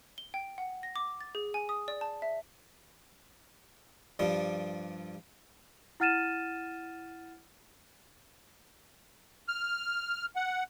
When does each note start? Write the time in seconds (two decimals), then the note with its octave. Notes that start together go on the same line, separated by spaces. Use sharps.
0.18 G7
0.34 G5
0.58 F#5
0.83 A#6
0.96 D6
1.21 A6
1.35 G#4
1.54 G#5
1.69 D#6
1.88 D5
2.01 A5
2.22 E5
4.19 G2 F3 G3
6.00 E4 F#5 F6 A6 D#7 E7
9.48 F6
10.36 F#5